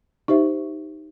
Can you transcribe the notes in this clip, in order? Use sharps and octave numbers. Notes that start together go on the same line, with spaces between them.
D#4 G4 C5 E5